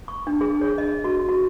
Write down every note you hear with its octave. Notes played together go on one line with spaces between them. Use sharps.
C#6
D4
G#4
C#5
D#5
F#4
F#4